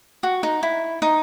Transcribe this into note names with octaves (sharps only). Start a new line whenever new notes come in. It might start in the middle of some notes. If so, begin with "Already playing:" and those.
F#4
D#4
E4
D#4